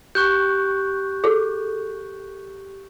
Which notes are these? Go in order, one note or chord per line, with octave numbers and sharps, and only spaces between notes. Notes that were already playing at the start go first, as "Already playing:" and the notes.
G4 C#6 F#6 G6
G#4 A4